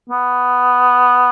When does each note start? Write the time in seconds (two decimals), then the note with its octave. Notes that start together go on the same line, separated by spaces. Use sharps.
0.09 B3